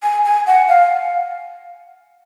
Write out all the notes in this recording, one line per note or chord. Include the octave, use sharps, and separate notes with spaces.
G#5
G#5
F#5
F5